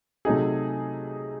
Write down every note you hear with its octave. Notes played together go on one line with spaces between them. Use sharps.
C3 F#3 A3 D#4 G#4